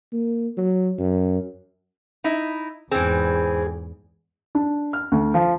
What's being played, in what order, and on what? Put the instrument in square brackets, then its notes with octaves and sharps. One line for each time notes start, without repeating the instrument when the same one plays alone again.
[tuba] A#3
F#3
F#2
[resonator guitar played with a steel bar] D#4 E4
[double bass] E2 G#2 [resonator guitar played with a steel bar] E3 C4 [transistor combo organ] G#4
[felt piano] D4
F6
D2
F3